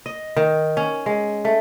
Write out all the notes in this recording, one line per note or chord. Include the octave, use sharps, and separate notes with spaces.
D#5
D#3
C#4
G#3
A3